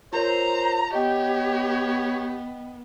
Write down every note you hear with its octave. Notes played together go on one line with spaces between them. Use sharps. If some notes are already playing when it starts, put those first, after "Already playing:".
F4 A#4 C5 C#5 A#5
B3 G4 C#5 D#5 G5